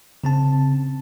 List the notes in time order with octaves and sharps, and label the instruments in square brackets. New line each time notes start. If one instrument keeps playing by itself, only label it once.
[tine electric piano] C#3 C4 A5